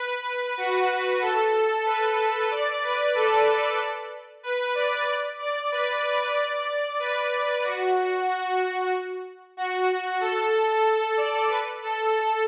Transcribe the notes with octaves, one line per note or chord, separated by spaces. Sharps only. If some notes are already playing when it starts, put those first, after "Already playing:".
Already playing: B4
F#4
A4
B4
D5
B4
A4
B4
D5
D5
D5
B4
D5
D5
B4
F#4
F#4
F#4
A4
A4
D5
B4
A4
A4